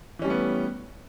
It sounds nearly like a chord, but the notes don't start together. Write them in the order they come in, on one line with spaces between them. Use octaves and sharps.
E3 C#4 G3 A3 B3